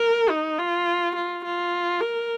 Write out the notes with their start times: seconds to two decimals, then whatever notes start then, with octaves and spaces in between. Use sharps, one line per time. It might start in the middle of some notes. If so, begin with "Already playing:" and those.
Already playing: A#4
0.29 D#4
0.58 F4
1.15 F4
1.44 F4
2.00 A#4